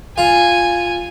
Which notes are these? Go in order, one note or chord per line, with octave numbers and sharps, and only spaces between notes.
F4 G#5